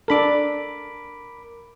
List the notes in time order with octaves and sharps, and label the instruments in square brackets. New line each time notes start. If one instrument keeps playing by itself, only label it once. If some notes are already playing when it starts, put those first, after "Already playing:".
[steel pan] D4 A4 [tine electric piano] A#4 B5 D6